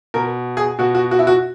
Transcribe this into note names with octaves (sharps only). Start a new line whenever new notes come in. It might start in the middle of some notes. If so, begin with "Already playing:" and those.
B2 A#4
G#4
B2 F#4
F#4
F#4
E4
F#4